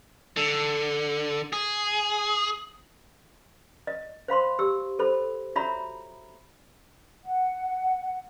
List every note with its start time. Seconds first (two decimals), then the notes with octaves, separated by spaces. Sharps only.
0.37 D3
1.53 G#4
3.87 D#5
4.28 C5 F5 B5 C6
4.59 G4 E6
4.99 A4 C5 B5
5.56 F4 F#4 C#5 E5 A#5 B5
7.24 F#5